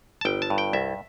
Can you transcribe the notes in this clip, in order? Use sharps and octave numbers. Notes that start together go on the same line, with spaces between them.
A5
G1 G5
A5
G2
G5
C2 E5